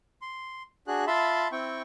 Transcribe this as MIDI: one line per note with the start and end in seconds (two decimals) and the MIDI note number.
0.22 0.63 84
0.87 1.05 62
0.87 1.05 66
0.87 1.05 68
0.87 1.05 90
1.07 1.48 65
1.07 1.48 76
1.07 1.48 81
1.07 1.48 83
1.07 1.48 84
1.52 1.82 60
1.52 1.82 64
1.52 1.82 79
1.52 1.82 85